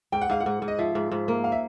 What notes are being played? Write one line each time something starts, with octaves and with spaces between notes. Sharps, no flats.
G#2 G5
F#5
G#2 F5
F#5
G#2
G#2
D#5
F3 E5
G#2
G#2
A#3
F5
E5